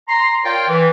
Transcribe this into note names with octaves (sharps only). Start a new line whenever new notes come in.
A#5 C6
F4 A#4 C#5 D5 F5 G5
E3